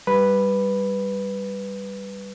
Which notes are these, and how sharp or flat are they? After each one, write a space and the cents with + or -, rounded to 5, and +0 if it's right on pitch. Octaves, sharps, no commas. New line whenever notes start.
G3 +0 B4 +0